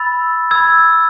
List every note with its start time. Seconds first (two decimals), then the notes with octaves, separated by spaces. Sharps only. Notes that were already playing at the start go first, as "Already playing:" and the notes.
Already playing: B5 E6 A6
0.51 B5 E6 G#6